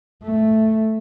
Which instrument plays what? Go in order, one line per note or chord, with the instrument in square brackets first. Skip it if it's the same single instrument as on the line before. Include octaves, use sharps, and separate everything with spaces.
[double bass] A3